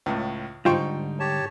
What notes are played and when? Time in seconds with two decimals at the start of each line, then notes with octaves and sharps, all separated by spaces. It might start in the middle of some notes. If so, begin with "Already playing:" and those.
0.06 C#2 A2
0.65 G#2 D3 G3 D#4 F4 C5 G5 C#6
1.20 G4 C#5 A5